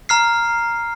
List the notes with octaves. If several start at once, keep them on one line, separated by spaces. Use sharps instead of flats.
A#5 F6 C7